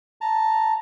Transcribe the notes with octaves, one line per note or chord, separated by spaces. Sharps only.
A5 A#5